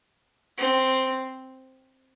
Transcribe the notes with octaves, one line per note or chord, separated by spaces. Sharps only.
C4